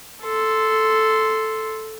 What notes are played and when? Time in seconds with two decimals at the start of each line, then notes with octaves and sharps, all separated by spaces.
0.23 A4 C6